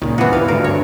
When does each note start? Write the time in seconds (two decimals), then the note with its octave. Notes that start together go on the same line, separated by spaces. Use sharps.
0.02 C#2 A#2 D#3
0.18 C3 E3 B3 F4 F#4
0.33 D#2 G#2 C#3 F5
0.48 D2 G2 A#4
0.64 C#5